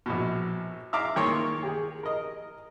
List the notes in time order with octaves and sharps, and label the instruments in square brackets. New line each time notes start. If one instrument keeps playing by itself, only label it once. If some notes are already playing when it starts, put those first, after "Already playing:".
[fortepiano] A#1 B2
E5 F5 A#5 D6
D#3 A#3 C#5 C6
G4 G#4
A#4 D#5